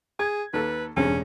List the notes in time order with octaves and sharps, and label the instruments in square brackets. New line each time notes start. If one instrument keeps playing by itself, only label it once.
[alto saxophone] G#4 [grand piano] G#6
[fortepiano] D#2 A4 [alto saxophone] B4
[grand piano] E1 [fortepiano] G2 C#3 C4 [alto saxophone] C#4